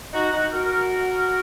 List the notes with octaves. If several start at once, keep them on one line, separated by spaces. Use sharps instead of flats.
D#4 F#4
D#4 F#4
F#4 A#4